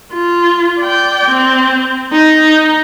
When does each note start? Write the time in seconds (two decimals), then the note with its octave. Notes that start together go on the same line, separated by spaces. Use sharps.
0.13 F4
0.80 D5 G5
1.30 C4
2.12 D#4